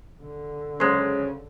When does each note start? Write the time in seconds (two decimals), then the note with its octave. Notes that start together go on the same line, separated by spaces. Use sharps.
0.22 D3
0.80 C#3 F#3 G#3 C5